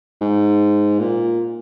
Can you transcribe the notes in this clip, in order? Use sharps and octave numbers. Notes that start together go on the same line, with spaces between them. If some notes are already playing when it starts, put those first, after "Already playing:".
G#2
A#2